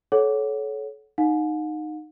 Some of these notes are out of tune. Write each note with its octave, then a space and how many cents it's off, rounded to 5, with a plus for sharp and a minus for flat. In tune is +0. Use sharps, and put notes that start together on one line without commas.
A4 -30 C#5 +0 F#5 +0
D#4 -15 F#5 -45